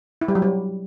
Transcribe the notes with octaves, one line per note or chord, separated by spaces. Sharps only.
E4
G3
F#3
G3